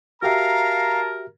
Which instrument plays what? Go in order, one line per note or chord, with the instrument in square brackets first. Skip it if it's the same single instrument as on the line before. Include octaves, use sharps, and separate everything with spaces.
[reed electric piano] F#4 G4 E5 [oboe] A#4 [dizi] F5 [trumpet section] A5 A#5